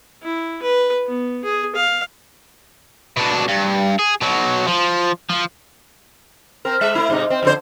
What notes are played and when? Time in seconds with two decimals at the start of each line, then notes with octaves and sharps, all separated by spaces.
0.23 E4
0.62 B4
1.06 B3
1.44 G#4
1.75 F5
3.17 B2 D4
3.49 G2
3.99 G#4
4.21 B2 F#3
4.67 F3
5.30 F3
6.65 C4 A#4
6.81 G#3 E5
6.95 A3 E4
7.10 G#2 C3 D#4
7.30 C4
7.43 F2 D3 C5